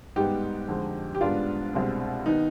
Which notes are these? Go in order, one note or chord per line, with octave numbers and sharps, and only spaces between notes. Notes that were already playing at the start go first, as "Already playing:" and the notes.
G#2 G3 B3 D#4 G4
F2 D3 G#3
G4
G#2 G3 B3 D4 F4
C2 B2 G#3 C4
D#3 B3 D#4